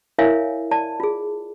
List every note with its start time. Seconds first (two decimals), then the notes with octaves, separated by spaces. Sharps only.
0.19 E4 A#4 C#5 E5 F5 G#5
0.71 D5 A5
1.00 F4 G#4